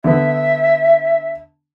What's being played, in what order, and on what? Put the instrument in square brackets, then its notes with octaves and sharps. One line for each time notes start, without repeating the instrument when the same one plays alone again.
[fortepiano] D3 B3 [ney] E5